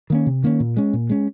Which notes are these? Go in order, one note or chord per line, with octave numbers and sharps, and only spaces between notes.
D#3 A#3 C#4
C3
D#3 A#3 C#4
A#2
G#3 C#4
A#2
G#3 C#4